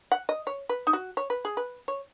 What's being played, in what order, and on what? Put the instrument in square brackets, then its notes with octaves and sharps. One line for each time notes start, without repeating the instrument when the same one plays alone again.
[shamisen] F#5
D#5
C#5
B4
D#4
F#4
C#5
B4
G#4
B4
C#5